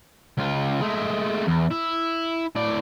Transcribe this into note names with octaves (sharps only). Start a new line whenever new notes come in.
C#2 F4
G#3 A3
E2
E4
A2 D5